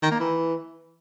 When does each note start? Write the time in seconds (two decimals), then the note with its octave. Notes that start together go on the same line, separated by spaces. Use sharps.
0.03 D#3
0.11 A#3
0.20 E3